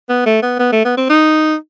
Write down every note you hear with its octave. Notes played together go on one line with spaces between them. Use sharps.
B3
A3
B3
B3
A3
B3
C4
D#4